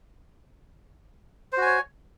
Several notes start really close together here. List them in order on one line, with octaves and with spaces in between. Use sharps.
C5 F#4 G#5 C#5